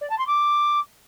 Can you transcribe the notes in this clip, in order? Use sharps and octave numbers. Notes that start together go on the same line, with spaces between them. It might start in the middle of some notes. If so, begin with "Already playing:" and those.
D5
A5
C6
D6